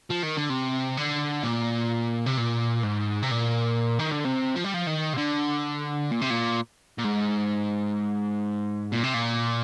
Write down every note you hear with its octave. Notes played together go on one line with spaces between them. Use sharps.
F3
D#3
D3
C3
D3
A#2
C3
A#2
G#2
C3
A#2
D#3
D3
C3
F3
G3
F3
D#3
C3
D3
A#2
C3
A#2
A#2
G#2
A#2
C3
A#2